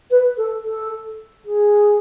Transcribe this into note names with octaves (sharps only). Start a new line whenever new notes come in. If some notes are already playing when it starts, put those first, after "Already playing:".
B4
A4
A4
G#4